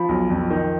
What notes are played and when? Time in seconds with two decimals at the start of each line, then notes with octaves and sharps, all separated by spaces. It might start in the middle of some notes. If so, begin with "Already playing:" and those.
Already playing: F3 B5
0.09 B1
0.30 F2
0.51 D#3